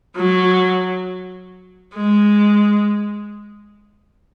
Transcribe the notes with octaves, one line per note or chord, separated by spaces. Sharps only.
F#3
G#3